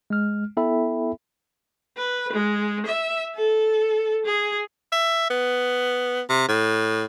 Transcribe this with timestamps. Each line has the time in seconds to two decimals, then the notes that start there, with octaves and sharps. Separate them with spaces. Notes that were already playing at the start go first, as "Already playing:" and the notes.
0.10 G#3 F6
0.57 B3 E4 A4 E5 G5 B5
1.97 B4
2.33 G#3
2.86 E5
3.35 A4
4.26 G#4
4.92 E5
5.30 B3
6.29 C3
6.48 A2